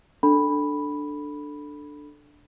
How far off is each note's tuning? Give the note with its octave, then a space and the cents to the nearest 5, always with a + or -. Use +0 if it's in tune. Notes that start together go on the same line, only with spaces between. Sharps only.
D4 +5 A4 +0 B5 +0